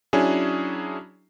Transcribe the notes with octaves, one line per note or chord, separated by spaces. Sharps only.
F#3 C#4 D4 E4 G#4